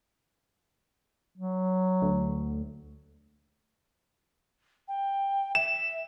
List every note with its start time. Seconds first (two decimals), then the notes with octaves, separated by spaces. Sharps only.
1.38 F#3
2.02 D2
4.88 G5
5.55 E5 E7